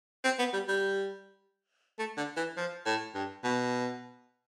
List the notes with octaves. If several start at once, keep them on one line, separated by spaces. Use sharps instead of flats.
C4
B3
G3
G3
A3
D3
E3
F3
A2
G2
B2